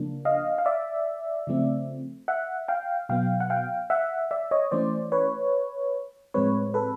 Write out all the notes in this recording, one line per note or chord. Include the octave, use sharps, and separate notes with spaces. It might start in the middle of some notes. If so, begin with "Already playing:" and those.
Already playing: C#3 F3 A#3 D4
D#5 F5
F5
D5 E5
C#3 F3 A3 C4
E5 F#5
F5 G5
B2 F#3 B3 F5 G5
F#5
F5 G5
E5 F#5
D5 E5
C#5 D#5
E3 A3 C#4 C5 D5
B4 C#5
A2 F3 G#3 C4 B4 C#5
A4 B4